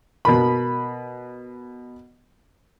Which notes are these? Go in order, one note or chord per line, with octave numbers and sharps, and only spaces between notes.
B2 A#4 B5